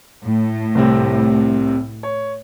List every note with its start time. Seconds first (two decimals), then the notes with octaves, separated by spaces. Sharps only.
0.24 A2
0.75 C2 C3 C4
2.03 C#5